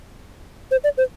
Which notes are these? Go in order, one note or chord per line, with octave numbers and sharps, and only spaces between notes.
C5
D5
C5